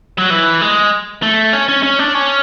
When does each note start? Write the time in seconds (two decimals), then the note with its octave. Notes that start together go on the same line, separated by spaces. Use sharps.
0.18 F#3
0.30 E3
0.61 G#3
1.23 A3
1.53 C#4
1.68 C#4
1.83 C#4
1.99 D4
2.14 C#4